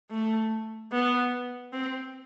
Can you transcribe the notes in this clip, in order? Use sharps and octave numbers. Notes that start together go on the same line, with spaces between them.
A3
B3
C4